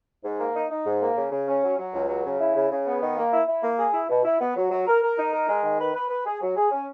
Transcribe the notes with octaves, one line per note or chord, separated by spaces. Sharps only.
G#2
A#3
D#4
D#4
G#2
A#3
C#3
C#3
C#4
F#3
F#3
C#2
F#3
C#3
E4
C#3
C#3
B3
D#3
A#3
E4
E4
A#3
G#4
E4
B2
E4
B3
F#3
F#3
A#4
A#4
D#4
A#4
G#3
D#3
B4
B4
B4
G#4
F#3
G#4
C#4